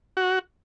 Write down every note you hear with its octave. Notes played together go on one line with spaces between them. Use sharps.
F#4